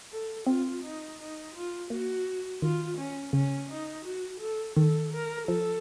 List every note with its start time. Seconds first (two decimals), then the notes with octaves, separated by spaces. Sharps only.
0.12 A4
0.47 C4 F4
0.83 D#4
1.19 D#4
1.55 F4
1.90 A#3 F#4
2.62 D#3 F4
2.98 C#4
3.33 C#3 C#4
3.70 D#4
4.05 F#4
4.40 A4
4.76 D#3 A4
5.13 A#4
5.48 F3 A4